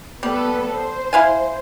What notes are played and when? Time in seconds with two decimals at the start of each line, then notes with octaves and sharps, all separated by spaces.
0.23 G3 B3 A4 B4
0.76 C5
1.13 E4 F5 G#5